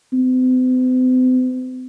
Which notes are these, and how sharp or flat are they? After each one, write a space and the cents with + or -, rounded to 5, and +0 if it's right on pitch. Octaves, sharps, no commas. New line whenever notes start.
C4 -45